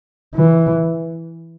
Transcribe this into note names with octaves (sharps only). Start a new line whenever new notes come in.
E3